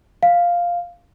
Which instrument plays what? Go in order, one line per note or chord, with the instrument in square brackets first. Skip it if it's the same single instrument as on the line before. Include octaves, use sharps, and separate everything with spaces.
[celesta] F5